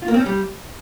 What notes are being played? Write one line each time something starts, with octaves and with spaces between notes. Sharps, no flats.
F4
A#3
C4
C#4
G3